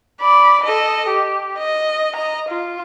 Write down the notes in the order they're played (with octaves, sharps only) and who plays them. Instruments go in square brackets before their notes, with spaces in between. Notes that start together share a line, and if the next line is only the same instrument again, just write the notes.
[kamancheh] D5 B5
A4 D#5
G4
D#5
D#5 A#5
F4